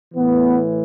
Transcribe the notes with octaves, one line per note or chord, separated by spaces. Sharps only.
A2 E3 B3